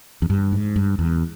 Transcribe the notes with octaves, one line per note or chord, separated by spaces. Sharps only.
E2
G2
G#2
G2
E2